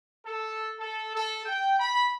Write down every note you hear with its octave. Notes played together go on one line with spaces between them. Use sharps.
A4
A4
A4
G5
B5